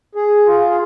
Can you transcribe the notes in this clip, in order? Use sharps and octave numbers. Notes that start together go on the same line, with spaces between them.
G#4
F4
G#4